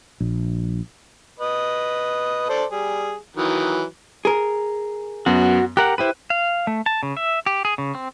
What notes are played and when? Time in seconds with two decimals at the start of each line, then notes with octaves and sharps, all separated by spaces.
0.20 A#1
1.40 B4 D#5
2.49 A4 C5 D5
2.71 G3 G#4
3.36 D#3 E3 F#3
4.25 G#4 A#4
5.26 F#2 B3 F#4
5.77 G4 A#4 F#5 F#6
5.98 E4 G4 B4 C5 D#7
6.30 F5
6.67 A3
6.86 A5
7.03 C#3
7.17 E5
7.46 G4
7.65 G#4
7.78 C#3
7.95 C4